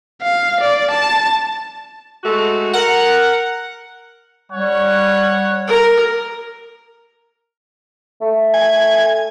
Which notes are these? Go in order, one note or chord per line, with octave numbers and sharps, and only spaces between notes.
F5
D5
A5
G#3 A3 F#4
A#4 F#5
G3 C#4 C#5 F#5
A#4
A3
G#5